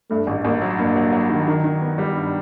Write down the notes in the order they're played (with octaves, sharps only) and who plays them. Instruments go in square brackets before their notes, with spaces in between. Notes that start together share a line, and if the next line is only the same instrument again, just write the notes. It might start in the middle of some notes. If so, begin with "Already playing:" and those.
[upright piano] G2 [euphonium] A3
[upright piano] A1
[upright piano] A1 [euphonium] A#3
[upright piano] F#3
[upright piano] G2 [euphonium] A#3
[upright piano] F#3
F#3
D#3
D#3
D#3
B3
G3
G2